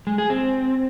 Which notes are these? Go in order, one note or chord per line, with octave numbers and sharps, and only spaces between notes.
G#3
G#4
C4